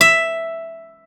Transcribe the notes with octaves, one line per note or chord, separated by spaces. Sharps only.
E5